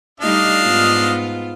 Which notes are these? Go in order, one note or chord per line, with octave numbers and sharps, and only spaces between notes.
G3 A3 D4 D#4 D#5 F5
G#2 B3 F4